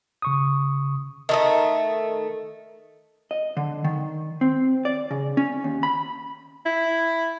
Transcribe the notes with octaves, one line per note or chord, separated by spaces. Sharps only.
C#3 C#6 D#6
D#3 A3 D#5
D#5
D3
D#3
C4
D5
C#3
C#4
D#2
B5
E4